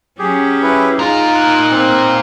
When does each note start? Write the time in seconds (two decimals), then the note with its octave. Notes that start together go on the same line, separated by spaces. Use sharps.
0.19 F#3 C#4 G4 G#4
0.63 E4 B4
0.99 A#2 G#3 D#4 F4 A#4
1.35 F#6
1.71 C4